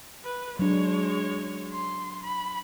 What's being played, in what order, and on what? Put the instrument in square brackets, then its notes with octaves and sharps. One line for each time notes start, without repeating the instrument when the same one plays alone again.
[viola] B4
[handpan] F#3 D4 [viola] G#3 C#5
[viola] C6
B5